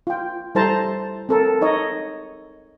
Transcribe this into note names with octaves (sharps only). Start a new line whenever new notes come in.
F4 G5
G3 E4 A4 C5 A5 A#5
C4 A4 A#4
D#4 C#5 D#5 A#5